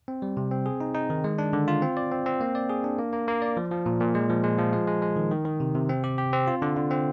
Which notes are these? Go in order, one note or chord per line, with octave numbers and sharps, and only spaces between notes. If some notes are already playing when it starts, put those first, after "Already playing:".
C4
G3
C3
C4
G#4
D#4
D#4
D#3
G#3
D4
D3
F4
C4
D5
C4
C4
A#3
D5
G#4
D4
A#3
A#3
A#3
D5
F3
F3
A#2
A#2
G#3
F3
G#3
F3
G#3
G#3
G#3
D#3
D#3
D#3
C3
C3
C4
G4
G4
C4
F4
D3
D3
C4